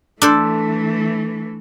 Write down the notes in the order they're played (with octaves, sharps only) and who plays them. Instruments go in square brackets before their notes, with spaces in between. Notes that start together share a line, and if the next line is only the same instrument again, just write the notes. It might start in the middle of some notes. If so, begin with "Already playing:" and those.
[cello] E3 A3 [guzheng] D4 A4 C5